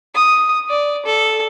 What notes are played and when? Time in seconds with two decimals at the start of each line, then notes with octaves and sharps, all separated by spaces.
0.15 D#6
0.69 D5
1.06 A4